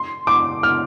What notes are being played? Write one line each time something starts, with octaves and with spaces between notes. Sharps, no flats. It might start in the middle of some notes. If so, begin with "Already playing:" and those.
Already playing: C6
D6
F6